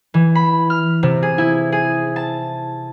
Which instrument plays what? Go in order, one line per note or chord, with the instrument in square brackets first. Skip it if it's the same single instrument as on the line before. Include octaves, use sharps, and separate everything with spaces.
[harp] E3
B5
F6
C3
G#4
E4
G#4
A5